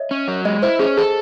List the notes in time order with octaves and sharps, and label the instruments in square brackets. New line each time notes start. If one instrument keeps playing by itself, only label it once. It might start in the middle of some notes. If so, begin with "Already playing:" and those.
Already playing: [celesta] C#5 D#5 E5
[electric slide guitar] C#4
F#3
[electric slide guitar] G#3 [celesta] D#5
[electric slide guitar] E4 [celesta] C5
[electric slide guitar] C#4 [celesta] G#4
[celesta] G#4 [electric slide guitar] A4